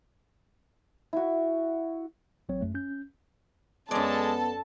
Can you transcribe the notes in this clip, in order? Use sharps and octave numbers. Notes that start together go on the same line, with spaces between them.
E4 F#4
A1 F#3 C4 C#5
F#2 A3
C#4 G6
F#2 G#3 B3 A4 D5 A5